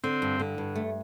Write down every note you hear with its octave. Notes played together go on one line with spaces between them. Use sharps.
D3 C4
G2
D3
G2
A3